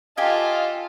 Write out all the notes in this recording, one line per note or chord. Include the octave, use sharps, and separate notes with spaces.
F4 G4 A4 D#5 F5 G#5